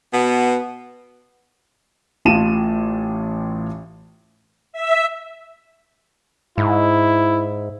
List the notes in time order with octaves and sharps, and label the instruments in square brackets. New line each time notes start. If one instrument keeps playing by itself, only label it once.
[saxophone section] B2 B3
[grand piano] A1 A2 F4 A5 D#7 E7
[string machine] E5
[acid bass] G#2 [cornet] E4